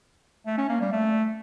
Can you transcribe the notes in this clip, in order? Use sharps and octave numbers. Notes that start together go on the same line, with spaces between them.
A3
C#4
A#3
G3
A3